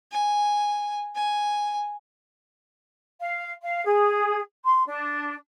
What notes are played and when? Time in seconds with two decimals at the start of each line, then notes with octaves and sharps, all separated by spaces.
0.12 G#5
1.15 G#5
3.20 F5
3.61 F5
3.85 G#4
4.64 C6
4.88 D4